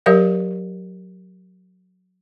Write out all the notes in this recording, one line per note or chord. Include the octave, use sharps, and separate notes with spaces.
F#3 G4 A#4 C#5 E5 F5